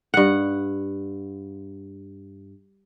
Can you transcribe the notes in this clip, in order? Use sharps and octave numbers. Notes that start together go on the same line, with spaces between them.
G2 F#5